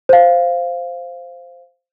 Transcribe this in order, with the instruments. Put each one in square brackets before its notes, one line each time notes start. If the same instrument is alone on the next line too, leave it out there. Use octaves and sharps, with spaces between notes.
[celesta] C5 F5